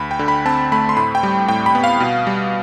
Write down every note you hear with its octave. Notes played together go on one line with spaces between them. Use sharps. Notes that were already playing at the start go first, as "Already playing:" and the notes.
Already playing: D2 B5
G5
D3
B5
C4 A5
A3 B5
C6
A2 B5
G5
G3
A2 G5
B5
B3
F5
B2
G3